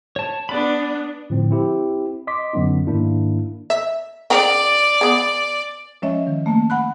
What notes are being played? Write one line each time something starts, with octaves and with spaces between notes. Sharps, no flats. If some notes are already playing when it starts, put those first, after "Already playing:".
C#5 A5
B3 D4 D5 B5
A2 D3 F3 C4
C4 E4 G4
D#5 C6 D6 B6
F#2 D3 F#3 B3 C#4 D#4
G#2 D#3 A#3 D4 E4
E5
C#3 A#4 D5 G5
B3 G#4
F3 G#3 C#4 C#5 D#5 E5
D#3
A3 A#3 A5
F#5 B5 F#6